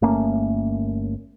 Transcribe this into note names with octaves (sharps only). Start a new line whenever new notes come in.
G1 A3 A#3 C#4